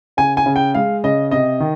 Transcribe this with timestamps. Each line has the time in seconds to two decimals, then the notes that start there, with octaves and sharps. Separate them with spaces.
0.17 C#3 G#5
0.37 G#5
0.46 C#3
0.56 G5
0.75 G#3 F5
1.04 C#3 D#5
1.31 C3 D#5
1.60 D#3